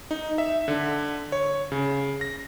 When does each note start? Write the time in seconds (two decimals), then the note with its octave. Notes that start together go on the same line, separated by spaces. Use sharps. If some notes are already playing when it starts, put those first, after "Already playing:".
0.11 D#4
0.38 E5
0.68 D3
1.32 C#5
1.72 C#3
2.21 A#6